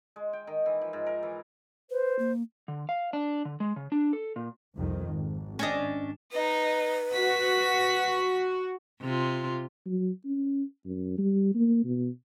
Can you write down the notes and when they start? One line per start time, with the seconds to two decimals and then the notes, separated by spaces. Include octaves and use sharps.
0.16 G#3
0.33 G5
0.47 D#3
0.66 E3
0.81 F3
0.93 G#2
1.06 A#4
1.23 E3
1.90 B4 C5
2.19 A#3
2.68 D3
2.89 F5
3.13 D4
3.45 D3
3.60 G#3
3.76 C#3
3.92 D4
4.13 A4
4.36 A#2
4.76 C2 F2 D#3
5.09 G#1
5.59 C#4 D4 D#5
6.33 D#4 B4 D#5
7.14 F#4 B6
9.02 C3 F4
9.86 F#3
10.25 C#4
10.85 F#2
11.18 G3
11.55 A#3
11.85 B2